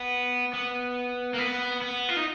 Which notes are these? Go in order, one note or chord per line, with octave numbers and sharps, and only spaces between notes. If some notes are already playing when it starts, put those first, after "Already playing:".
Already playing: B3
B3
A#3
B3
B3
F4
D#4